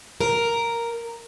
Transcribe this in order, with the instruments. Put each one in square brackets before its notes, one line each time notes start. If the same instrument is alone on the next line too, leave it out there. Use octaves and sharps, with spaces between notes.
[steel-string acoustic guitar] A#4